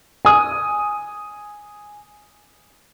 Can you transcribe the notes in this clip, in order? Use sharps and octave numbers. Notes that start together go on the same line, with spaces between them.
G#5 D#6